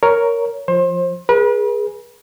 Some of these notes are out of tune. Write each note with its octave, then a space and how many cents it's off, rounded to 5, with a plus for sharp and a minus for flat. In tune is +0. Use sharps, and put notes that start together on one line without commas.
A#4 +0 C#5 +10
F3 +0 C5 +30
G#4 +0 B4 -40